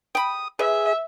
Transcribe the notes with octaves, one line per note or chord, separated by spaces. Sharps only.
G5 B5 D#6
G#4 B4 E5